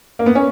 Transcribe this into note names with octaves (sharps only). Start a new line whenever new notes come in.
A#3
B3
C#4